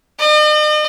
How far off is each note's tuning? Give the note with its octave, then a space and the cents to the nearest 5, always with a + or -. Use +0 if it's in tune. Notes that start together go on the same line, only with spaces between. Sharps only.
D#5 -45